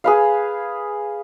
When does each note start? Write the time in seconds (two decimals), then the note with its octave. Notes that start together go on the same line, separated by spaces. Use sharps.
0.04 G#4 B4 F5